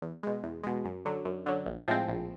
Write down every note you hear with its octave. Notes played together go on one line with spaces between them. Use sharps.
E2
B2 G#3
E2
B2 G#3
F#2
D3 F#3
F#2
D3 F#3
A#1
A2 F3 G#3 C4
A#1